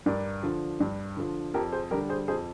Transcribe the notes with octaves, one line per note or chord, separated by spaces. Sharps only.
G2 A#4 D5
D3 F3
G2
D3 F3
F2 G4 A#4
G#4 C5
D3 G3 G4 A#4
G#4 C5
F2 G#4 C5